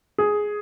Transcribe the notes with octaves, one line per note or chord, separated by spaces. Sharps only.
G#4